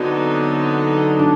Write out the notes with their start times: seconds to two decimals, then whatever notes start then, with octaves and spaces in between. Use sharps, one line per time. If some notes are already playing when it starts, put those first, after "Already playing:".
Already playing: D3 F#3 B3 C4 D#4
1.19 D4